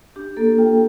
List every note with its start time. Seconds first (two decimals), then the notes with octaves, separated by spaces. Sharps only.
0.16 D4 G4
0.37 A#3 A4
0.58 F4 G5